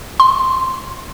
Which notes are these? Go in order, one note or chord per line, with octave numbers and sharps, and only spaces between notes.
C6